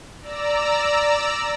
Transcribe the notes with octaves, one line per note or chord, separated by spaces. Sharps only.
D5 A#5 E6